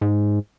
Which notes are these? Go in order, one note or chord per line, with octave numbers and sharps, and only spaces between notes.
G#2